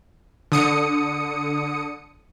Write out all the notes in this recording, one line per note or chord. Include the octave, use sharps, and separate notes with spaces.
D3 D#6 C#7